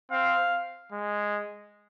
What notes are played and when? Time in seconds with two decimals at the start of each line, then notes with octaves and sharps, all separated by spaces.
0.12 C4 F5
0.92 G#3